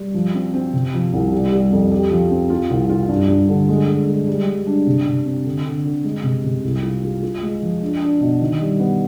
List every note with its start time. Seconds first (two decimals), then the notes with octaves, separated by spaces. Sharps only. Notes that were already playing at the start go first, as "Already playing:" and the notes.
Already playing: G3
0.14 F3
0.34 C4
0.54 C4
0.73 C3
0.93 F3
1.13 C2
1.32 G3
1.52 G3
1.71 F2
1.91 G4
2.10 F3
2.30 C4
2.50 F4
2.70 C2
2.89 F4
3.09 G2
3.28 G2
3.49 D3
3.69 G#3
3.88 G#3
4.08 G#3
4.27 G3
4.48 G3
4.67 D4
4.87 C3
5.06 C3
5.26 C4
5.45 D3
5.65 D3
5.85 D3
6.04 G#3
6.24 C3
6.44 C3
6.64 C2
6.83 F4
7.03 F4
7.22 F4
7.43 G#3
7.62 F3
7.82 D4
8.02 D4
8.21 B2
8.41 D#3
8.60 G3
8.80 B3